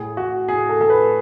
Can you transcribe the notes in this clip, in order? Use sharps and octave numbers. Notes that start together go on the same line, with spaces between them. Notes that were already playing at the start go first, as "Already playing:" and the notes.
Already playing: A2 G#4
A2 F#4
A2 G#4
A4
A2 A4
B4